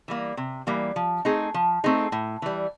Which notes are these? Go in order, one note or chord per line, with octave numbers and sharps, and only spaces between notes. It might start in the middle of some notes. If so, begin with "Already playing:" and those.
E3 G3 A#3
C3
E3 G3 A#3
F3
A3 C4 D#4 G#4
F3
A3 C4 D#4 G#4
A2
E3 G3